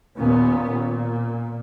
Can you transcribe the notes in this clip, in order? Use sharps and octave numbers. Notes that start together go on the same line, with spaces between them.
D#2 A#2 B3 C#4
A#2